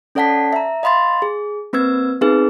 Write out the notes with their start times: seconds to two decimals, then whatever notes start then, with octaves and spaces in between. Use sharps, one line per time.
0.15 C#4 A4 D5 F#5 A5 B6
0.53 E5 A#5
0.83 D#5 F5 B5 C6 A6
1.22 G#4
1.73 A#3 C4 B4 E6 G#6
2.21 B3 C4 D#4 G#4 B4